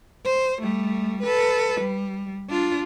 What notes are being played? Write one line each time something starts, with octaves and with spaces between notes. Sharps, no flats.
C5
G3 A3
A4 B4
G3
D4 F4